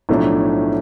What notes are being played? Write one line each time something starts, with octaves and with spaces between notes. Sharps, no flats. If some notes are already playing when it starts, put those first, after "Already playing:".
B1 A2 F3 A3 D4